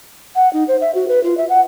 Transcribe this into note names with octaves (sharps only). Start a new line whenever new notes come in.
F#5
D#4
C5
E5
F#4
B4
F4
E5
F#5